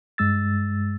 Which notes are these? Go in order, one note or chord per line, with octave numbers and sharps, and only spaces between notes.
G2 G#3 E6 A6